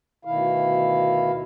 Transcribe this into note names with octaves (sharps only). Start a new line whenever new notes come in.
D2 B2 D#3 E4 F5